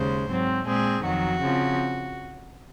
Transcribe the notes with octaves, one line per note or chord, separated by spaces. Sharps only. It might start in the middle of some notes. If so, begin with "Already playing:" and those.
Already playing: D#2 C#3 G#3 C5
G#2 F#3 C4
A#2 G#3 C4 G#4
F2 D#3 F#3 F#4
C#3 F3 C4